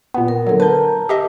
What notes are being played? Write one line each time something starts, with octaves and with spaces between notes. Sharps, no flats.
A#2 B3
A#4
D3 F#3
A#4 B4 A5 G6
G4 D#5 E5